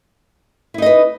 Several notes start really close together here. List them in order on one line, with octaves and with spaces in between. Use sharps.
E4 D#4 D#5 B4